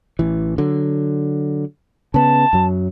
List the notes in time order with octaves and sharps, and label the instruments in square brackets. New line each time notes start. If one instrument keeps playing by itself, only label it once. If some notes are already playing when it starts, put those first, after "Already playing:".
[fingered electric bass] A1 E3
D3 F#3
[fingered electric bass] C#3 B3 [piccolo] A5
[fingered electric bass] F#2 F#3